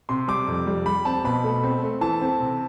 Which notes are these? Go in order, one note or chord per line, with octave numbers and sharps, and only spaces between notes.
C3 C6
G3 D6
F2
G3
G3 B5
C4 A5
B2 B5
A3
C4
A3
E3 A5
C4
C3